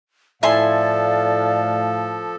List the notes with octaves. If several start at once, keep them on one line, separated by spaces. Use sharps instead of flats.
A2 F3 E4 A4 D5 F5 G#5 C6